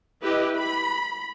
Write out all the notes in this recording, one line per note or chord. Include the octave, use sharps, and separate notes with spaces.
E4 G4 B4 D#5
B5